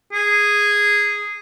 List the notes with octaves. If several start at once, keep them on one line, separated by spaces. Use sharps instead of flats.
G#4